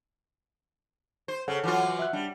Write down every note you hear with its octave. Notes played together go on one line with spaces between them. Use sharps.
C5
C#3 A4 C#5 F#5
E3 F#3 F4
E5 F#6
G3 D4